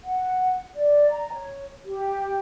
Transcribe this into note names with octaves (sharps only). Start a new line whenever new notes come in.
F#5
D5
A#5
C#5
G4